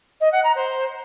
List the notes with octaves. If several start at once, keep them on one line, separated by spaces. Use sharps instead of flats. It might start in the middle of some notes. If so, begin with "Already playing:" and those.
D#5
F#5
A#5
C5